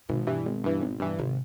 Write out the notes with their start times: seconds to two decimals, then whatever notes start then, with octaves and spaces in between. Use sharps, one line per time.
0.09 G#1 B2
0.27 G2 E3
0.45 G#1
0.64 G2 E3
0.81 G#1
1.00 G2 E3
1.18 G#1 C3